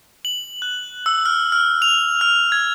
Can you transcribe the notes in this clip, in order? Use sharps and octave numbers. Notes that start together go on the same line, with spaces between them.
F#7
F#6
E6
F6
F6
F7
F6
G#6